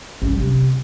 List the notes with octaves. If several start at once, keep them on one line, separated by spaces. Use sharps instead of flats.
C#4
G3
C3